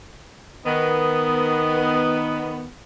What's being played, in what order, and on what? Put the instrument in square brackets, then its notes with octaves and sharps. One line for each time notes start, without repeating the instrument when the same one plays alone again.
[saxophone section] D#3 B3